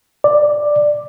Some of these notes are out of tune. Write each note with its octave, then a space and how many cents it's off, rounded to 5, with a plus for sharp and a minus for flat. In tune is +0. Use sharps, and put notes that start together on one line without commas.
D5 +10